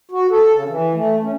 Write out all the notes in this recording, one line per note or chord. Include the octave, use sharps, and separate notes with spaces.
F#4
A4
C#3
E3
A3
C#4